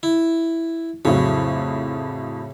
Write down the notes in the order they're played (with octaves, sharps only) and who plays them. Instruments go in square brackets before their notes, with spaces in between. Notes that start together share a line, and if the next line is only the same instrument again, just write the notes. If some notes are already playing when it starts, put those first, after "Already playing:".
[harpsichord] E4
[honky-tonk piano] F2 A2 F#3 [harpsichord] C#3